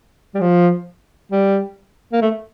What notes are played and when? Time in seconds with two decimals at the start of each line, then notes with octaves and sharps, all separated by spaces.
0.35 G3
0.41 F3
1.32 G3
2.13 A#3
2.22 A3